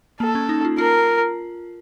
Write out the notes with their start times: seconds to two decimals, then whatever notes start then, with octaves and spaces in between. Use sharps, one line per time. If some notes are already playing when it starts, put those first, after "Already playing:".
0.20 A#3 A4
0.35 C#4
0.49 D#4
0.65 F4
0.78 F4 A#4